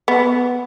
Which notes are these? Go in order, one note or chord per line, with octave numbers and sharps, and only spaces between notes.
B3